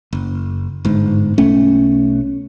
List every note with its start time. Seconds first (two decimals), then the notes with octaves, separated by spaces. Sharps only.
0.13 F#1
0.85 G1 G#2
1.38 B1 A3 C#4